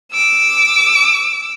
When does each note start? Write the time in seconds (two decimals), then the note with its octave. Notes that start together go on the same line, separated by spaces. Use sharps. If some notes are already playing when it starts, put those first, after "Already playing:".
0.13 D6 E6